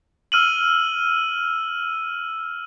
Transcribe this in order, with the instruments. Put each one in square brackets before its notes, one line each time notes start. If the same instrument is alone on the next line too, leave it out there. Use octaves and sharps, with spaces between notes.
[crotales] E6 F6 D#7 F#7